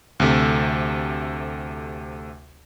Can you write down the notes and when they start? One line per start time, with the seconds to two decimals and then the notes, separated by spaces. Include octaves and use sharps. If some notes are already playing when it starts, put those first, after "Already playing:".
0.20 D2 C3 A3